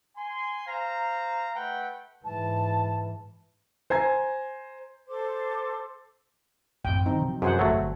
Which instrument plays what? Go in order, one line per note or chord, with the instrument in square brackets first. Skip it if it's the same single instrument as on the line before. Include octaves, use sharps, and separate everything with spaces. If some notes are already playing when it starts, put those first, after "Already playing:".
[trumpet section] G#5 C6
C5 F5 A#5
A3 B4 F#5 G5
[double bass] G#2 E3 [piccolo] A5
[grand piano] C5 G#5 A#5 G#6
[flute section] A4 C5 C6 D6
[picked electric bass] A1 F#2 C4 [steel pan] G5
[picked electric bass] D#3 F#3 C#4 [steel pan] C4 D#4
[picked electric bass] C3 F3 F#3
[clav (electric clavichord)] F#2 [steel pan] G#4 C5 F#5
[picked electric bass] G1 F2 [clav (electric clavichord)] F#3 A3
[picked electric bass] G1